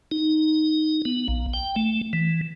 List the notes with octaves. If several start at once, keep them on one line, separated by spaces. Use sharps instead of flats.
D#4
B3
A#1
G5
A3
E3